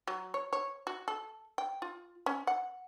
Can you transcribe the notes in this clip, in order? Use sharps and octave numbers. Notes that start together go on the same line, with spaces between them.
F#3
C#5
C#5
F#4
A4
G5
F4
C#4
F#5